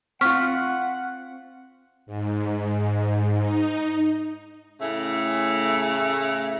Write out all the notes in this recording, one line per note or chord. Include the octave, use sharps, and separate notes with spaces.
C4 F4 F#5 C#6 F6 B6
G#2
D#4
A2 C#3 A3